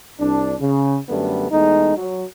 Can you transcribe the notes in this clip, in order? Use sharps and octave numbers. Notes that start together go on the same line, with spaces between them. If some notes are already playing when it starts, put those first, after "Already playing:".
C2 D4
C#3
F#2 D3 G3 A3 B3
E2 G#3 A3 D#4
F#3